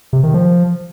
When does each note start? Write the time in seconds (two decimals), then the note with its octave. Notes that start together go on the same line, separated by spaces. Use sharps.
0.13 C3
0.23 D#3
0.34 F3